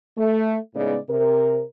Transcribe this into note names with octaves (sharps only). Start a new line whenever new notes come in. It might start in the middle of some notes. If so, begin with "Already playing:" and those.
A3
A2 C#3 G#3 B3 D#4 D5
C3 A#4